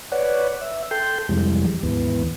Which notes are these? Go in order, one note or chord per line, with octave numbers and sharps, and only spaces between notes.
B4 C#5 D5 F#5
E5
A4 G5 C6 G6
F2 C3 E3 G3 G#3
D#2 G#2 E3 B3